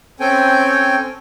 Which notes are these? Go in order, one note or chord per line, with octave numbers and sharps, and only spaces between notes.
C4 C#4 A4 G5 G#5